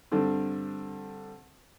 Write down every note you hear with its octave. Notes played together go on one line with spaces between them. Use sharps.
G2 D3 C4